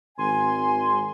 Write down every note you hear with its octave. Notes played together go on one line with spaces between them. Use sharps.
G#1 G#5 C6